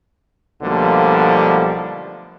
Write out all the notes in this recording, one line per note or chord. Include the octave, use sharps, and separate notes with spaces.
B1 D3 F3 G3 A3 A#3